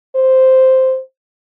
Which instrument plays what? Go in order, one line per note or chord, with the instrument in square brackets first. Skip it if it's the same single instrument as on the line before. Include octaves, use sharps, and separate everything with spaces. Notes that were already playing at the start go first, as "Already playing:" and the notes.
[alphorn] C5